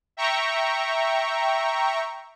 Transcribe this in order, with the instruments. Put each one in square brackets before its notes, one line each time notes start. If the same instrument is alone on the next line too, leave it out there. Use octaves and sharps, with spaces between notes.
[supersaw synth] E5 G5 A#5 C#6